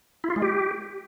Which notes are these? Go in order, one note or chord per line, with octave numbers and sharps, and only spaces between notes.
E4
F4
G#3
G4